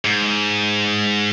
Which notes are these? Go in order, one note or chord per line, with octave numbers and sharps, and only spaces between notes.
G#2